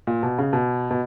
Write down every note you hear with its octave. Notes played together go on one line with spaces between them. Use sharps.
A#2
B2
C#3
B2
B2